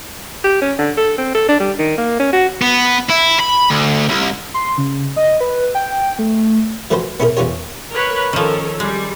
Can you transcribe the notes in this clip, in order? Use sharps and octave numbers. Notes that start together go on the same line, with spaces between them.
G4
C#4
D3
A4
C4
A4
D4
G3
D#3
A#3
C#4
F#4
B3
E4
B5
D2
C2
C6
C#3
D#5
B4
G5
A3
F3 A3 C#4 F#4 B4 C5
B3 C#4 E4 G#4 A#4
E2 E3 C#4 F4 G4 C#5
A#4 B4 C#5
D#3 F3 C#4 A4 A#4
G3 G#3